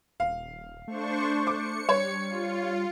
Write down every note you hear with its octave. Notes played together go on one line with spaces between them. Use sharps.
D#1 F5
A3 D4 C5 C#6
D6 C#7
G3 C#5
F4